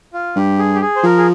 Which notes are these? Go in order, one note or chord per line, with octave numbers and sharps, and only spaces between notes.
F4
G2 G4
G#4
G4
G#4
C5
F3 A#4
G#4